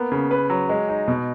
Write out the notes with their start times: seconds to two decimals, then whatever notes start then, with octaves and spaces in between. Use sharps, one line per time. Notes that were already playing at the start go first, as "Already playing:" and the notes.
Already playing: A#3 B3
0.12 C#3
0.31 B4
0.50 F#3
0.69 G#3
0.89 D#4
1.08 B2